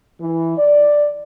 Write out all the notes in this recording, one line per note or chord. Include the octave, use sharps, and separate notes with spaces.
E3
D5